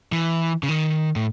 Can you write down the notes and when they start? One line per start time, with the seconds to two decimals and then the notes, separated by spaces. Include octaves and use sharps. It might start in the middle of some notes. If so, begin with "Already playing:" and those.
0.12 E3
0.63 C#3
0.69 D#3
1.16 A2